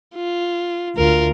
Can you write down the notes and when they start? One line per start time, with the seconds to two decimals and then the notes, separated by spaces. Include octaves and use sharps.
0.15 F4
0.98 D2 F4 A#4